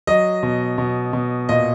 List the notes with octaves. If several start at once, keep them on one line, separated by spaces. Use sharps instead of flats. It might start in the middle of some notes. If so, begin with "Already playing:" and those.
F#3 D#5
B2
B2
B2
A#2 D#5